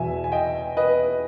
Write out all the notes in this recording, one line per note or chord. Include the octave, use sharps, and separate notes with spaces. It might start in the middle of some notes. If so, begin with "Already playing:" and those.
Already playing: E2 B2 E5 G#5
G#5
D#5 G5
B4 D#5